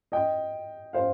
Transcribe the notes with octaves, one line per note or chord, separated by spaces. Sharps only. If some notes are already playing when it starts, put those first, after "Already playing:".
D#5 G5
C5 F5